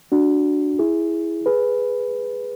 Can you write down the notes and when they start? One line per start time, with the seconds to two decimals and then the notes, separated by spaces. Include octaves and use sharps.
0.12 D4 F#4
0.79 E4 G#4
1.46 G#4 B4